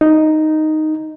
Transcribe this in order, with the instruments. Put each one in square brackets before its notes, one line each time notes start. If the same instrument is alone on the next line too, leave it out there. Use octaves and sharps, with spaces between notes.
[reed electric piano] D#4